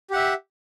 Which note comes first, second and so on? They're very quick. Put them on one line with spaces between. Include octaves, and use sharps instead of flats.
G4 F#5 E5